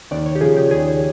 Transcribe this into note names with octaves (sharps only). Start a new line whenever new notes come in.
D#2 D5
C#5
G4
C#3 F3 G#4
G4
D#2 G#4